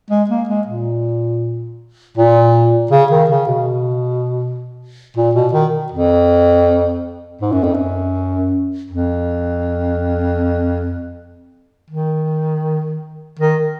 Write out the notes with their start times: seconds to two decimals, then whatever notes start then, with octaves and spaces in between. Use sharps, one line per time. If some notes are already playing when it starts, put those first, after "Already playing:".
0.10 G#3
0.30 A#3
0.49 G#3
0.67 A#2
2.17 A#2
2.91 C#3
3.11 D#3
3.30 C#3
3.47 B2
5.17 A#2
5.35 B2
5.53 D#3
5.92 F2
7.41 G#2
7.52 F#2
7.64 F2
7.74 F#2
8.91 F2
11.90 D#3
13.39 D#3